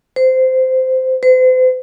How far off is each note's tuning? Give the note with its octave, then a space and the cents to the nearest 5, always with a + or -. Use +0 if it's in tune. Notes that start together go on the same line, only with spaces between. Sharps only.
C5 -15
C5 -40